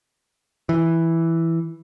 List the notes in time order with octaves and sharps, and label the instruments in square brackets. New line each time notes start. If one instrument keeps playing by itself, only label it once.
[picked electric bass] E3